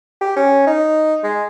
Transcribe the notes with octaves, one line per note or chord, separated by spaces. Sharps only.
G4
C#4
D#4
G#3